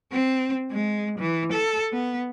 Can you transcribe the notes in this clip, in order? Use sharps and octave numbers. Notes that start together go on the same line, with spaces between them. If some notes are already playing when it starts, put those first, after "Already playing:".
C4
G#3
E3
A4
B3